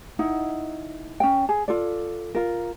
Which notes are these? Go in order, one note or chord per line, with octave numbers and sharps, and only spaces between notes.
D#4 E4 F#5
C#4 G5
G#4
F4 A4 D5
F4 A#4